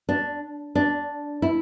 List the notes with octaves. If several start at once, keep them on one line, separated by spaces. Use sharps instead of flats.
D4
D4
E4